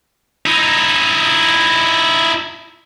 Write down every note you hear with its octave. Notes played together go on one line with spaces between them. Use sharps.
D#4 E4